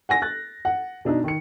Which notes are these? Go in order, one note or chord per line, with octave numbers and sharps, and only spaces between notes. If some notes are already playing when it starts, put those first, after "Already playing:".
F#5 G#5 A#6
F#6 A6
F#5
B2 D4 D#4
D#3 C#7